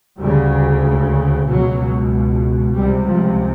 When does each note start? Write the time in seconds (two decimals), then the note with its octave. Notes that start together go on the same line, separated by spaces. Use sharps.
0.19 D2 C#3 G3
1.47 C#2 B2 F#3
2.75 C#2 C3 G3
3.07 F3